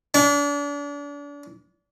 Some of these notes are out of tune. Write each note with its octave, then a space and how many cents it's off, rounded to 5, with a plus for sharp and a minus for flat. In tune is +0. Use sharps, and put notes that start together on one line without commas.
D4 -35